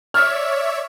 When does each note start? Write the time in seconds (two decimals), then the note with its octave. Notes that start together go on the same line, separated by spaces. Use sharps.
0.14 C#5 D5 E5 F6